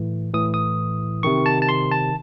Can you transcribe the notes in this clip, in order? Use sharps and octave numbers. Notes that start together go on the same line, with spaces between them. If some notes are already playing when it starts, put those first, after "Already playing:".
Already playing: A2 E3
A2 E3 D#6
D#6
C3 D#3 C#6
A5
A5
C6
A5